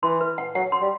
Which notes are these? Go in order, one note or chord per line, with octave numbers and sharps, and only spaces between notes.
E3 C6
B4
F#5
F#3 F#5
C6
G3